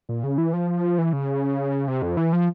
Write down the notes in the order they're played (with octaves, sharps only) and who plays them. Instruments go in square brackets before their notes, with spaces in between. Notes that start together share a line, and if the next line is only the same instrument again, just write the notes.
[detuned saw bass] A#2
C#3
E3
F3
E3
C#3
C3
F2
E3
F3